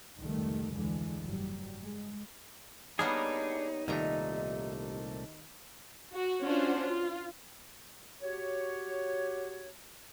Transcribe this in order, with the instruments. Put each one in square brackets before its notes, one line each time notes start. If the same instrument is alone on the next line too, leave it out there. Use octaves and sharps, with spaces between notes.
[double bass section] F1 C#2 D#3 G3 A3
D2 D3 E3 G#3
F#1 G#2 F#3 G3
G#3
[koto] G3 A#3 B3 [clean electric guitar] D4 G#4 [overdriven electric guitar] D#4 [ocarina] C#5
[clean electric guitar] C2 A#2 A3 [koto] D#3 A#5 [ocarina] G4
[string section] F#4
C#4 D4 F4 F#4 C5
F4
[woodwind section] F#4 G4 C#5